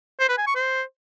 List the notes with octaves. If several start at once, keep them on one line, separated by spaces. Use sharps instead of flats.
C5
B4
G#5
C#6
C5